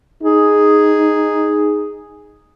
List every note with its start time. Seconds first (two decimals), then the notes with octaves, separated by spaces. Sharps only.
0.23 D#4 G#4